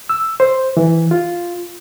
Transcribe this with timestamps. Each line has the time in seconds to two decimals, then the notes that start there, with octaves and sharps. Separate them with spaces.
0.09 E6
0.40 C5
0.77 E3
1.11 F4